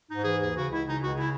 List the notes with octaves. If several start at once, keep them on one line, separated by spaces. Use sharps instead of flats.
G#2 D#4
E3 G#4
D#2 G#4
C#3 F#4
C#2 E4
C#3 D#4
C#2 F#4
C#3 E4